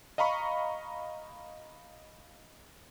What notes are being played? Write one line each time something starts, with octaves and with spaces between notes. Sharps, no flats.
D#5 F5 A#5 B5 C#6